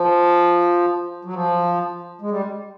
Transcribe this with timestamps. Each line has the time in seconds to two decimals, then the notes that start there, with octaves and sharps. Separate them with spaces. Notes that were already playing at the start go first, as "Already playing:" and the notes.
Already playing: F3
1.25 F#3
1.33 F3
2.21 G#3
2.30 G3